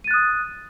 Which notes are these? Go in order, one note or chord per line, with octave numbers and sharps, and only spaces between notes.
D#6 F#6 A6 D#7